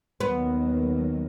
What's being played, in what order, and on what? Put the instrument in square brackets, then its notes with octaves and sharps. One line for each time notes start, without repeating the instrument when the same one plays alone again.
[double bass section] D#2 D#3 F#3 [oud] B3